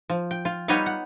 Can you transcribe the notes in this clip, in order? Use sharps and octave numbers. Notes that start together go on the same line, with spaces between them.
F3
G5
F4
G3 B3 D#4 C#5 D#5 F5
F#5